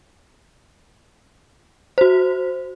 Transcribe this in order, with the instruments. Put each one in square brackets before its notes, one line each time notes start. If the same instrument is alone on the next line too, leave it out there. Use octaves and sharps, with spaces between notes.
[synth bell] F#4 C5